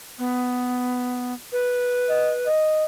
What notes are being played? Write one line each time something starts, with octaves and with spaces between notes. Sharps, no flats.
B3
B4
D#5
D#5